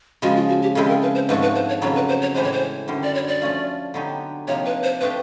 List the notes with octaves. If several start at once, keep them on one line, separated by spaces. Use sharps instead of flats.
C#3 F3 G#3 F#4
F4
F#4
G4
C#3 F3 G#3 C4 E4 A4
A#4
B4
C5
G#2 F3 A3 D4 F#4 B4
B4
C5
C#5
F2 C#3 F#3 B3 C#5
B4
C5
C#5
A2 E3 G#3 C5
C#5
C5
F#2 D3 G3
D5
C#5
D5
F3 A3 C#4 F4
D3 F#3 B3 D#4 G4
C3 F3 A#3 D#4 C#5
B4
C5
F3 A3 D4 G4 B4